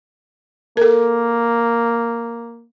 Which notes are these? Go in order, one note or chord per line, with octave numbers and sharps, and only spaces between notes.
A#3 A4 A#4